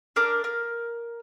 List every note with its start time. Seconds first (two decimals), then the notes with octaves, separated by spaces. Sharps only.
0.16 D4 A#4 D6 F6
0.44 A#4